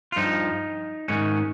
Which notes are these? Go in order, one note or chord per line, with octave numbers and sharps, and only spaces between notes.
F4
G2 F3 D#4
G#2 D#3 C#4